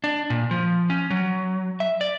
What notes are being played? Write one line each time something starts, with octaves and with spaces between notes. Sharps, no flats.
D4
A#2
F3
C#4
F#3
E5
D5